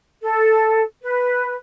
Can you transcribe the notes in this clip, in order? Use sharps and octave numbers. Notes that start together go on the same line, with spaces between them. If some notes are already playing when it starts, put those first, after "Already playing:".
A4
B4